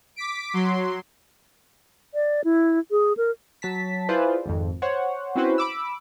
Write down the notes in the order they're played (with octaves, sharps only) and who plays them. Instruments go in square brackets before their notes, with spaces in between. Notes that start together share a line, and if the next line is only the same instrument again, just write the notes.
[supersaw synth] D6 B6 D7
F#3 C6
[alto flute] D5
E4
G#4
A#4
[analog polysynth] F#3 A5 B6
E4 F4 G#4 B4 C5 D5
G#1 F2
C5 C#5 F#5
C4 C#4 E4 F#4 B4 C5
B5 D6 E6